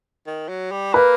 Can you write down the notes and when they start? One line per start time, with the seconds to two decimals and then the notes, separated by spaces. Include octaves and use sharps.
0.27 D#3
0.49 F#3
0.71 G3
0.94 A#3 B4